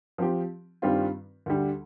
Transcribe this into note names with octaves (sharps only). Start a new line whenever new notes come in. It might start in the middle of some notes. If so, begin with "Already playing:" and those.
F3 C4 G4
G2 D#3 G3 C4 F4
D2 D3 G3